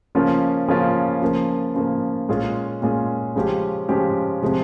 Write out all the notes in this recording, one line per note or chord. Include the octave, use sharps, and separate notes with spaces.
C#3 F3 A#3 C#4 F4
C#3 F3 A#3 C#4 F4
C#3 F3 A#3
C#3 F3 A#3
A#2 G#3 C#4 F4 G#4
A#2 G#3 C#4 F4 G#4
C#3 F3 G#3 C#4 G4
C#3 F3 G#3 C#4 G4
C3 F3 G#3